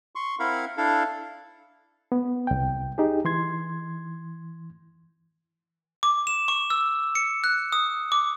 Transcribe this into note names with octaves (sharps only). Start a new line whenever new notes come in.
C6 C#6
C4 E4 A#4 F5 F#5 B5
D4 E4 A4 F5
B3
C2 G5
D#4 G4 G#4
E3 C6 G#6
D6
E7
C#6
E6
C#7
F#6
D#6
D6